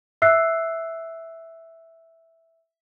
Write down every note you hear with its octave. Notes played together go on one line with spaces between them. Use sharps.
E5 E6 F#6 C7